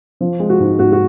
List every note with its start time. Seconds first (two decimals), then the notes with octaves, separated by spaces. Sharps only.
0.21 F3
0.40 G#3
0.49 F#4
0.60 G#2
0.79 G#2 F#4
0.92 F#4